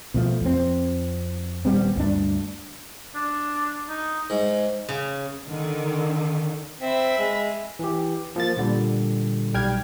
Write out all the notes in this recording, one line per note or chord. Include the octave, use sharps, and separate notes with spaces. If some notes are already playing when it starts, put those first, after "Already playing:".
B2 F3 A3
F2 C4
D#1 G3 B3 C4
D2 G2 D4
D4
D#4
G#2
C#3
D3 D#3
C4 E5 B5
G#3
E3 G4
F3 A#3 A6
A#2 D3 G3
B1 G3 G5 F6 G#6